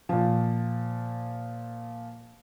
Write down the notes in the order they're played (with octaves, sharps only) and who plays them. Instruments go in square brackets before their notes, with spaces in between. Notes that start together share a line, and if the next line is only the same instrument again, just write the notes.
[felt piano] A#2 F3